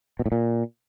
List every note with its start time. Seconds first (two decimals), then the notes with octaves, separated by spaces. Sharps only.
0.19 B2
0.26 A2
0.32 A#2